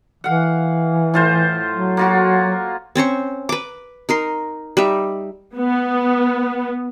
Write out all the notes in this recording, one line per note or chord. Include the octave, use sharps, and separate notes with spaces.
E3 F5 F#5
A2 F4 C5
F#3
A#3 F4 F#4
C4 C#4 C5 C#6
B4 D6
D#4 A#4 C6
G3 D#4 E5
B3